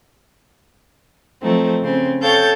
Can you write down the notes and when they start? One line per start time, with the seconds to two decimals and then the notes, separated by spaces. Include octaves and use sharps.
1.42 F3 F#3 A3 C4 D#4
1.81 C#3 C4
2.21 A4 C#5 F5 G5 G6 A6